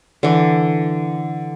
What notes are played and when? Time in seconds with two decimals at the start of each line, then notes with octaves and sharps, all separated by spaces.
0.23 D3 E3